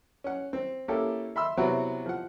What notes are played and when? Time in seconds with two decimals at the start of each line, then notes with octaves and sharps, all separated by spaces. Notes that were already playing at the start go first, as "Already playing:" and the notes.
0.24 C#4 F#5
0.53 C4
0.88 A#3 C#4 E4 G4 A4
1.36 E5 B5 C6 E6
1.57 C3 F#3 B3 C4 E4 F#4
2.06 F3 F#5